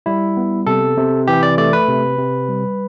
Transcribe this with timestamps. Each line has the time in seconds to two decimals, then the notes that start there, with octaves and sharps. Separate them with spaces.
0.06 G3 E4
0.37 B3
0.67 C3 A4
0.97 C3
1.28 E3 G4
1.43 D5
1.58 A3 D5
1.73 B4
1.88 C3
2.18 C3
2.49 G3